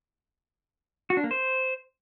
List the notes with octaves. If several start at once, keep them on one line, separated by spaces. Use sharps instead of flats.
F#4
D4
A#3
C5